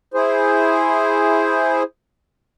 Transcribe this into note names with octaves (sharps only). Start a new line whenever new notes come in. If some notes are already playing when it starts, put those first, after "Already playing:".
E4 G#4 C5